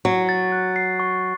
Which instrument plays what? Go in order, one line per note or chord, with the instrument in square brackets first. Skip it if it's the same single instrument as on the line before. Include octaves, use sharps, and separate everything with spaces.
[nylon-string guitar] F#3 [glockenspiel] C#6
[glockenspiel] A6
F#6
C7
C#6